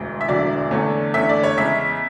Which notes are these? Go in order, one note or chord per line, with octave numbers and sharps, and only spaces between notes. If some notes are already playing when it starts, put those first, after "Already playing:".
Already playing: E1 D2
E5
E1 D2 D3 F#3 D5
E2 D3 A3 C#4
E2 D3 A3 C#4 E5
D5
C#5
E2 C#3 G#3 C#4 E5